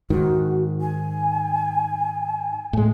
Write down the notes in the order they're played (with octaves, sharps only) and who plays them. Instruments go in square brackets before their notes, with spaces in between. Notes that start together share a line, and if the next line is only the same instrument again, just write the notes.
[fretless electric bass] G#2 D#3 [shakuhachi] F#4
[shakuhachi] G#5
[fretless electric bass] A2 G#3